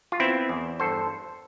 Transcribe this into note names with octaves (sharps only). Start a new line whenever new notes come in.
F4
B3 C4 E4
E2
G2 A4 C5